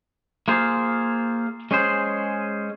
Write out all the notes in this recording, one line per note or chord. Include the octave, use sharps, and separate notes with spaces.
A#3 F4 G#4 C5
G#3 C#4 G#4 C5